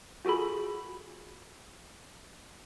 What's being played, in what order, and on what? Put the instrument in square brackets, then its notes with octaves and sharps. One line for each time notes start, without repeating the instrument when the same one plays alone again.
[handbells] F4 F#4 G#4 A4 B5